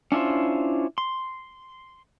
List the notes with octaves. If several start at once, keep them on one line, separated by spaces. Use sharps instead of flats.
C#4 D4 E4 F4 C5
C6